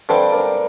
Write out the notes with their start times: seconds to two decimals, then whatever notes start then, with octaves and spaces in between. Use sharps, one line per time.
0.09 G2 D3 G3 C4 A4 C5
0.32 A#4 D5